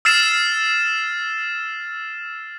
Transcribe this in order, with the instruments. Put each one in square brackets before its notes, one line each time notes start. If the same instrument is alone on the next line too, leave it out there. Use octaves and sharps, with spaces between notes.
[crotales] E6 F6 A6 C7 E7